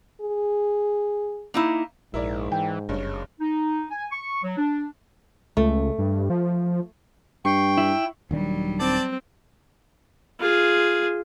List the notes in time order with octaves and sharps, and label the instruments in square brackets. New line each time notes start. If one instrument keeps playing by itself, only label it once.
[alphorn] G#4
[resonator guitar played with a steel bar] A#3 D#4 E4
[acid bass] A#1 [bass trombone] G#2 [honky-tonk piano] E4 A#4 D5
[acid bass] E3 [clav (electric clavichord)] G5
[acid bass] F#1 [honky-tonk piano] G2 G#3 C#4
[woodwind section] D#4
G#5
C#6
F#3
D4
[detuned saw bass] C#2 [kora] A3
[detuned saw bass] G2
F3
[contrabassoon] G2 [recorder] G5 [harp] C#6 C7
[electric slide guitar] E4
[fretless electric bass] D#1 D#3 D4 [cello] F#3 G3
[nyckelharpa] C4 [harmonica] D5 A5 D6
[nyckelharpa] F4 G#4